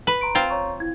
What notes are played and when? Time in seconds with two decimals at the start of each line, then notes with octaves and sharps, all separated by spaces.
0.07 B4
0.21 A#5 C6 D7
0.35 C4 F4
0.50 C#5 A#5 C#6
0.80 E4 G#6